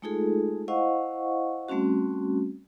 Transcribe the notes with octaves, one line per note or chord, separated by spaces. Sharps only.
G#3 A3 D#4 F4 G#4 A4
E4 C5 D#5 F5 F#5 C#6
G3 A3 C4 C#4 F#4